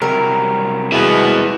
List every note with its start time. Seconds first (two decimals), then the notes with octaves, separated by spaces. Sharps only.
0.02 C3 F#3 G3 A#4
0.92 B2 G#3 E4 G#4 B4